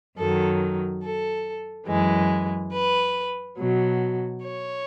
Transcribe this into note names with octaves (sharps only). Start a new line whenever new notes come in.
F#2 D#3 F#3 A4
A4
F#2 E3 G#3
B4
B2 F#3
C#5